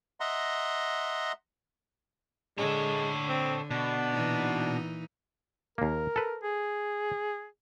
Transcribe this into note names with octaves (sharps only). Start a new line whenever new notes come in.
D#5 E5 F#5 A#5 C6
D3 G#3 A4 C#5
C4
B2 D4
A#2 E3 D#4
D#2 A#3 A#4
A4 B4
G#4